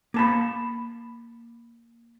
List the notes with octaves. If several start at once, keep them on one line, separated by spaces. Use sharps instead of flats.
A#3 A5 B5